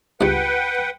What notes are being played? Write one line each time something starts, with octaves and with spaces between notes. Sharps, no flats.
C#2 G2 B4 F#5 G5